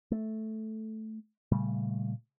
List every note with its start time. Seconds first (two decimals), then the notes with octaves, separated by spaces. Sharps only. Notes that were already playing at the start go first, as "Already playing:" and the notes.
0.11 A3
1.52 A#2 C#3 G3 A3